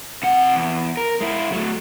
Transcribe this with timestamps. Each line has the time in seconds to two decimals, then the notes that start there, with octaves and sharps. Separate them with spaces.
0.23 C3 F#5
0.55 E2
0.97 A#4
1.21 G#3 E4
1.52 F#3 A3